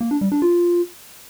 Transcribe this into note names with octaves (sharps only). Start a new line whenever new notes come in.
A#3
D4
G3
D4
F4